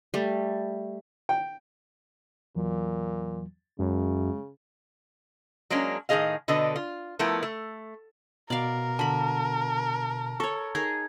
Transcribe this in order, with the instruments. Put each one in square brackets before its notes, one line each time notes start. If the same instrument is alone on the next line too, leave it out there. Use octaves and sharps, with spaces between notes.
[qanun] G3 A3
[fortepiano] G5
[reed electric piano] E2 E3 F#3 [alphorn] A#2
[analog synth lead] F#2 [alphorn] C#3 [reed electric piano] G#3
[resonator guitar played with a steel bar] F#3 G#3 A#3 C#4 D4
A2 D#3 E4 G#4 D#5 F5
B2 D3 A4 B4 D#5
F4
F3 A3 B3 E4 A#4
A3
[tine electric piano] B2 [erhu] A#4 [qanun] D5 F5
[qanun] D3 B5 [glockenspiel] A5
[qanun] A4 C#5 [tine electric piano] C#6
[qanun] D#4 G#4 A#4 [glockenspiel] G#6